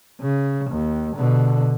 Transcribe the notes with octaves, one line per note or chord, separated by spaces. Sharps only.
C#3
D#2
B2 D3